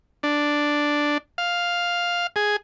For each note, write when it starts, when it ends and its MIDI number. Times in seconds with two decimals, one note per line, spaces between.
0.23 1.18 62
1.38 2.27 77
2.36 2.56 68